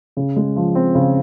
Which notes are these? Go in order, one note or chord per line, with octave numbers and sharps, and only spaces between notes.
C#3
G#3
F3
C4
C#3